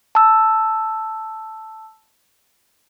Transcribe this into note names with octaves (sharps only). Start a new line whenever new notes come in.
A5 E6